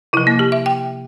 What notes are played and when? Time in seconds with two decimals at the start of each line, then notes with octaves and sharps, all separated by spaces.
0.13 C3 F3 E4
0.27 A#3
0.39 G4
0.52 E5
0.66 G5